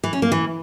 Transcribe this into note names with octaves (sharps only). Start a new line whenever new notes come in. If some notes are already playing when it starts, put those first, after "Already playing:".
E3
C#4
A#3
E3